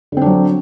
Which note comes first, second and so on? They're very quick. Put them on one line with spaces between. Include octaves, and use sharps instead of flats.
D3 C4 D4 F#3